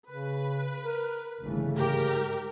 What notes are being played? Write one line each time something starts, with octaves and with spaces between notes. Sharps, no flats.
C#3 B4
A#4
G1 C#3 E3 A3
G#2 G4 A#4